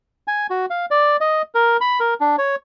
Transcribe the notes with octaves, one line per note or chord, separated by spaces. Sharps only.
G#5
F#4
F5
D5
D#5
A#4
B5
A#4
D4
C#5